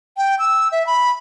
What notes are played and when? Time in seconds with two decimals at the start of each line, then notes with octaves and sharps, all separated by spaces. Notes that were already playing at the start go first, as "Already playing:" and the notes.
0.17 G5
0.39 E6
0.72 E5
0.87 B5